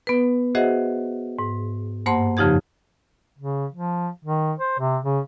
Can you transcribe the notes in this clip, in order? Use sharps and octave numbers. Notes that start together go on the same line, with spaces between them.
B3 B4
F#4 G#4 C5 D#5 E5 F#5
G#2
G2 A#3 C5 F#5 A5 C6
F2 C#3 F3 D#4 G4 G#6
C#3
F3
D#3
C5
C3
C#3